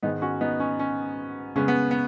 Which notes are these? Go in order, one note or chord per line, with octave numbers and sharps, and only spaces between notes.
G#2 D#3 G#3 B3 D#4
C#4 F#4
B3 D#4
C#4
C#4
C#3 G#3 B3 C#4
B3
B3